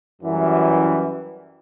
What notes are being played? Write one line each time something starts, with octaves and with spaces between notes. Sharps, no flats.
F#2 E3 G3